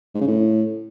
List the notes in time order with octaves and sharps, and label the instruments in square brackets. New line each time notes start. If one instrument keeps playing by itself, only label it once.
[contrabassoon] G#2
C#3
A2